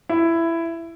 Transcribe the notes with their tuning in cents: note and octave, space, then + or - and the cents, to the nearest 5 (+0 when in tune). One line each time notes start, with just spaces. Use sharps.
E4 +15